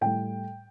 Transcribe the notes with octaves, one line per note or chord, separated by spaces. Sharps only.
A2 G3 G5